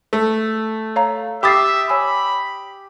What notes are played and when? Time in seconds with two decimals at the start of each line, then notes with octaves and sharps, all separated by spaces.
0.13 A3
0.96 C#5 F5 A#5
1.43 G4 E5 B5 D6 D#6 A6 C7
1.89 C#5 G#5 B5 E6